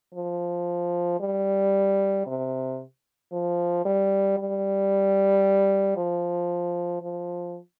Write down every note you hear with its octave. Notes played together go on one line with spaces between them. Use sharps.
F3
G3
C3
F3
G3
G3
F3
F3